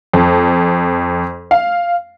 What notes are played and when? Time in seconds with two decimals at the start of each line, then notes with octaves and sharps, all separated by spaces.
0.13 F2
1.51 F5